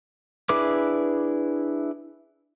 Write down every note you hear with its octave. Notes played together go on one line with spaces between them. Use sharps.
D4 E4 G#4 B4 D6